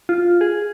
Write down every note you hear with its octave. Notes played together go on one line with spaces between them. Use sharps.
F4
G#4